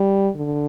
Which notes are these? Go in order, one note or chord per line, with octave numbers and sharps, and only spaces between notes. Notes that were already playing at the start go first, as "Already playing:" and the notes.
Already playing: G3
D3